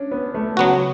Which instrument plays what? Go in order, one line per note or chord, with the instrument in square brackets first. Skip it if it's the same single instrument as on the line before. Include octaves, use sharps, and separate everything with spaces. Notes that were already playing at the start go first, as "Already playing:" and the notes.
Already playing: [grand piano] C#4 D4
B3
A3
[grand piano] C#3 [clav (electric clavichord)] F#3 B3 F#4